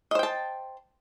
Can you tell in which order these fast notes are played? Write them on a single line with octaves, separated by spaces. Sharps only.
D#5 C5 G5 A5